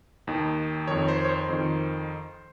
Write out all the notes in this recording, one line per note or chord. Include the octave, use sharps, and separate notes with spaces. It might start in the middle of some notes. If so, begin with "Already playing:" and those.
D#2 D#3
F2 D#3 C#5
C5
C#5
C5
F2 D#3